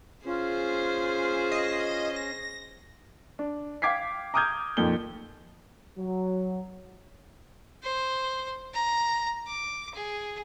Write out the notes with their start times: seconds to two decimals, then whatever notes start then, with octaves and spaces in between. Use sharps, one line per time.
0.26 C#4 F4 G#4 C5
1.52 D#5
2.16 A#6
3.39 D4
3.82 F5 G5 D6 G#6 B6 C7
4.34 A#5 D6 D#6 F6 G6 G#6
4.77 F2 A#2 D#3 G7
5.98 F#3
7.83 C5
8.74 A#5
9.47 D6
9.94 G#4